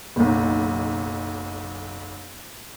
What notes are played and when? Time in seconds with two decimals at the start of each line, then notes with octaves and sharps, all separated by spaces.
0.16 F#1 B1